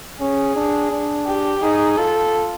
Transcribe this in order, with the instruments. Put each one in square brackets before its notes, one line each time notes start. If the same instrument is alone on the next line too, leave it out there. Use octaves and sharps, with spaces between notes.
[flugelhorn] C#4 [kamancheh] G#4
[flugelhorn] D4
D4
[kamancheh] G4
[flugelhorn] D#4 [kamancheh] G#4
[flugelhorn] F4 [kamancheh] A4